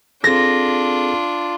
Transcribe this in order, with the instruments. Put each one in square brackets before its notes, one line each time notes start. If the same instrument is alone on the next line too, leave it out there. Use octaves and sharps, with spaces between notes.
[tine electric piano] C4 G#4 A4 [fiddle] D4 F4 [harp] A#6